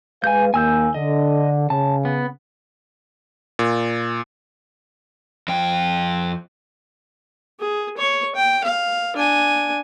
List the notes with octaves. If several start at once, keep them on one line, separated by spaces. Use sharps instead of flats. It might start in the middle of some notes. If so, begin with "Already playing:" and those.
G#3 B4 F5 G#5 G6
D#2 A#3 G#5 E6 G6
D3 D#5
C#3 A5
B3
A#2
F2 G5
G#4
C#5 C#6
G5
F5
D4 G#5